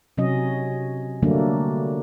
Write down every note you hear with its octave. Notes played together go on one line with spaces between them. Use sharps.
C3 F#3 C#4 D#5
D3 F#3 G3 A3 A#3 D4